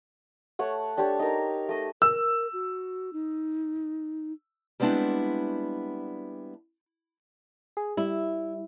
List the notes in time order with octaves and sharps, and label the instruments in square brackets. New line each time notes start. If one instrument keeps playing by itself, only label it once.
[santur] A3 C#5 F#5
D4 G4 A4 C#5
D#4 A#4
A3 D#5
[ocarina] A#4 [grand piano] E6
[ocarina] F#4
D#4
[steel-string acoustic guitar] G3 G#3 B3 C4 D4 E4
[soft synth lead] G#4
[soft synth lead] G3 [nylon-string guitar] E4